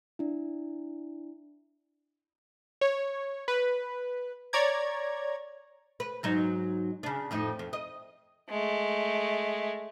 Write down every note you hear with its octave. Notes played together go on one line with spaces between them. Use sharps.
D4 E4
C#5
B4
C#5 D5 A#5 G#6
B4
G#2 F#3 D#4
C#3 D4
F2 A2 D#4
F2
D#5
G#3 A3